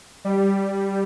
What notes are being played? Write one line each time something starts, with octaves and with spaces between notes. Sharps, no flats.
G3